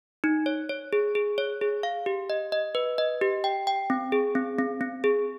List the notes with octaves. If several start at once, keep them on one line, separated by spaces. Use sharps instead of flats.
D#4
C#5
C#5
G#4
G#4
C#5
G#4
F5
G4
D#5
D#5
B4
D#5
G4
G5
G5
C4
G#4
C4
C4
C4
G#4